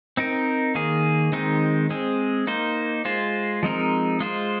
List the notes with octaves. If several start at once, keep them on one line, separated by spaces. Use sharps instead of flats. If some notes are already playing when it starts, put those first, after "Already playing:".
C4 D#4 A#4
D#3 A#3 G#4
D#3 G#3 C4 D#4
G#3 C4 G#4
A#3 D#4 C5
G#3 F4 C5
F3 G#3 C4 D#4 A#4
G#3 F4 C5